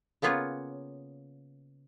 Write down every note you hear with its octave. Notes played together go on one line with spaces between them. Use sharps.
C#3 A#3 B3 F4 C#5